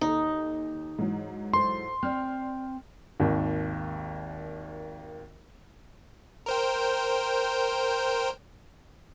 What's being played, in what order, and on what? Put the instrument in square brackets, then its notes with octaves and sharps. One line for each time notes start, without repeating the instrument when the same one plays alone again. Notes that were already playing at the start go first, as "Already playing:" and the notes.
[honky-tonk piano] D#2 A4 [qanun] D#4
[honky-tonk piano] G#2 E3 F#3
[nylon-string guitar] A4 C5 [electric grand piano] C6
[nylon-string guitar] C4 [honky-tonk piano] D5 F6
[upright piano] G#1 D#2
[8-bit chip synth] A#4 C5 G5